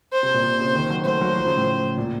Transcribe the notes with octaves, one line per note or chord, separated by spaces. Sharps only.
C5
C3
A#2
C3
C#3
D#3
F#3
A3 C5
F#3
F3
C#3
A2
A#2